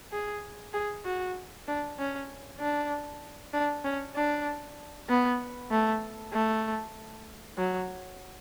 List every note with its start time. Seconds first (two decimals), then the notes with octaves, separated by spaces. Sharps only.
0.12 G#4
0.73 G#4
1.05 F#4
1.68 D4
1.99 C#4
2.60 D4
3.53 D4
3.84 C#4
4.16 D4
5.09 B3
5.71 A3
6.33 A3
7.57 F#3